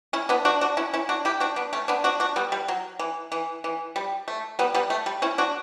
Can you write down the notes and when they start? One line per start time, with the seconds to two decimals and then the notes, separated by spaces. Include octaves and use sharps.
0.13 C#4 E4
0.29 B3 D4
0.45 D4 F#4
0.61 D4 F#4
0.77 C#4 E4
0.93 C#4 E4
1.09 D4 F#4
1.25 E4 G4
1.40 D4 F#4
1.56 B3 D4
1.73 A3 C#4
1.88 B3 D4
2.04 D4 F#4
2.20 D4 F#4
2.36 G3 B3
2.52 G3
2.68 F#3
2.99 E3
3.32 E3
3.64 E3
3.96 G3
4.28 A3
4.59 G3 B3
4.74 G3 B3
4.90 A3
5.06 G3
5.22 C#4 E4
5.38 D4 F#4